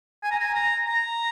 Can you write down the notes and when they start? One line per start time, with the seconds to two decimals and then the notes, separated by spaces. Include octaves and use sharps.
0.23 G#5
0.32 A#5
0.40 G#5
0.54 A#5
0.86 A#5